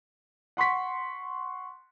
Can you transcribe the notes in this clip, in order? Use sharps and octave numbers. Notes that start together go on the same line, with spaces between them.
F#5 C6 C#6 B6